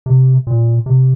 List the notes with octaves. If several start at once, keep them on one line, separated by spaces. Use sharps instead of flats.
C3
A#2
C3